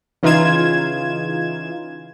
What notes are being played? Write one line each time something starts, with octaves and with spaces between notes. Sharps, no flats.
C#3 E3 D#4 F4 G#6 E7